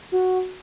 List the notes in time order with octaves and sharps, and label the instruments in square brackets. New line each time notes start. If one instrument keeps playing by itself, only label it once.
[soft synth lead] F#4